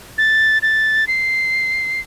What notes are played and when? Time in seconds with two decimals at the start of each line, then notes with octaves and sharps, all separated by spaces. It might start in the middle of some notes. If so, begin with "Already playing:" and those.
0.18 A6
0.62 A6
1.07 C7